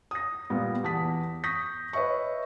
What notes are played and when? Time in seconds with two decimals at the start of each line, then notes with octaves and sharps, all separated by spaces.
0.11 D#6 A#6
0.50 A#2 G3 B3
0.84 E2 A5 D#6 B6
1.44 C#6 D#6 G6 A#6 B6
1.93 B4 C#5 D#5 E5 C#6